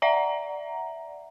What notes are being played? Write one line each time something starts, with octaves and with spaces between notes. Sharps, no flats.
D5 E5 F#5 A#5